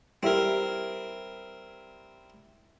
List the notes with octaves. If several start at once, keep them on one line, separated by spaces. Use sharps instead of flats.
G3 C4 E4 A#4